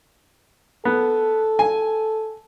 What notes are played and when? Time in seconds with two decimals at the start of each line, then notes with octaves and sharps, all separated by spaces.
0.85 B3 A4
1.59 G#5